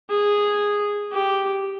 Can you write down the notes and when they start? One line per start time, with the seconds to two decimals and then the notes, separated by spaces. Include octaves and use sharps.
0.10 G#4
1.12 G4